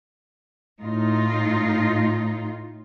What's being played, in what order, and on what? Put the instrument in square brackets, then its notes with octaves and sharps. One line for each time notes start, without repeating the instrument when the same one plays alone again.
[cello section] A2 D#4 F4